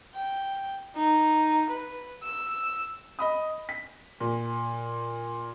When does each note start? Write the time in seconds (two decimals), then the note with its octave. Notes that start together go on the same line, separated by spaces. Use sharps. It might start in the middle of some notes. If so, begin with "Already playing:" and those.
0.15 G5
0.95 D#4
1.70 B4
2.23 E6
3.19 D#5 B5 D#6
3.69 B6
4.20 A#2